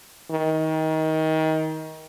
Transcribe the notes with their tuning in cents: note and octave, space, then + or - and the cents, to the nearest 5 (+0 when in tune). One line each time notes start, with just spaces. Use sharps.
D#3 +25